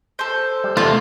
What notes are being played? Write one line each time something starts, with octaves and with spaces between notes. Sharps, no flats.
A4 C5
G3
E2 C3 A3 F4